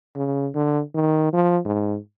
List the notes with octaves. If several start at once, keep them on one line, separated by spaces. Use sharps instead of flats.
C#3
D3
D#3
F3
G#2